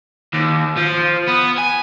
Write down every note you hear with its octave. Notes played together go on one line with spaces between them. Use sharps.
D#2
F3
B3
G#5